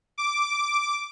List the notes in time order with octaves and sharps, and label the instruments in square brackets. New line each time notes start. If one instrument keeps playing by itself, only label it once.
[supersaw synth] D6